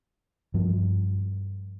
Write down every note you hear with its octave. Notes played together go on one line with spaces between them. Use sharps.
G2 F3